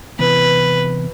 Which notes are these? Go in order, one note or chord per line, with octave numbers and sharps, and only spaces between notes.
C3 E3 B3 B4